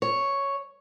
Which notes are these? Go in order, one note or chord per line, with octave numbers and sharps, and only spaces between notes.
C#5